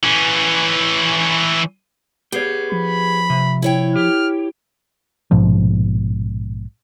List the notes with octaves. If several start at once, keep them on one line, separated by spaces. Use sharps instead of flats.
E3 C#4
B3 G4 G#4 C#5
F3 B5
C3
E4 C#5 G5
G4 F6
A#1 G#2 B2 F3